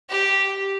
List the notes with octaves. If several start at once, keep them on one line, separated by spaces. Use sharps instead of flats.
G4